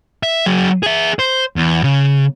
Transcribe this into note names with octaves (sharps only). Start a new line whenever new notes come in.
E5
F#3 G#4
G#4 E5
C5
E2
C#3